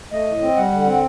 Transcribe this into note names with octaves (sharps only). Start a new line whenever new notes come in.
A3 D#5
A2
C4
G3 F#5
D3
C4